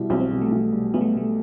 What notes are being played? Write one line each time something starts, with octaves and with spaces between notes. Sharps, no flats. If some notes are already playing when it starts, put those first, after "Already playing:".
Already playing: B2 G3 E4
B1 C4
C4
B2 G3
A3
B1
B2 G3
B1 B3
A3
B2 G3 A3